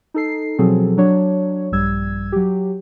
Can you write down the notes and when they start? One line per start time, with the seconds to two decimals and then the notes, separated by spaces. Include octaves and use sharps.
0.14 D#4 A4 C7
0.58 B2 F3 F#3 C4 G#4 A4
0.97 F#3 D4 C#5
1.72 A#1 G2 G3 E6 G#6
2.32 F#3 G4